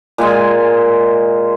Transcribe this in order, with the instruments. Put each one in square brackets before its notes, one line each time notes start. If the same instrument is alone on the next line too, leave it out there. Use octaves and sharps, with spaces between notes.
[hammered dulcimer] A#2 G#3 G#5 C6